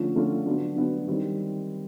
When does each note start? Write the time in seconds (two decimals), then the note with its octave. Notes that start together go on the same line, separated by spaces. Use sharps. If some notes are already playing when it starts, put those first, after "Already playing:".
Already playing: D3 F3 A3 C#4 F4
0.15 D3 F3 A3 C#4 F4
0.46 D3 F#3 B3 D4
0.77 D3 F#3 B3 D4
1.08 D#3 G3 C4